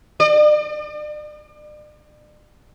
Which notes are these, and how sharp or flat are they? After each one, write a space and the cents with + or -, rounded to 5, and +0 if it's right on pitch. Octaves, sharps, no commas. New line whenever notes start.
D5 +40